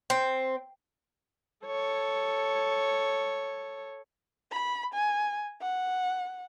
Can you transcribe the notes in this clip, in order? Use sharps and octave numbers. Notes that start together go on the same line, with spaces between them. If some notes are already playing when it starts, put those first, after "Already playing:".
C4
A4 C#5
B5
G#5
F#5